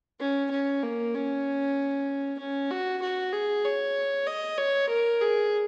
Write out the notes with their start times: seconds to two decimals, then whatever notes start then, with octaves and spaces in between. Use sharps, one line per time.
0.20 C#4
0.51 C#4
0.83 A#3
1.14 C#4
2.39 C#4
2.70 F#4
3.02 F#4
3.32 G#4
3.64 C#5
4.26 D#5
4.58 C#5
4.89 A#4
5.21 G#4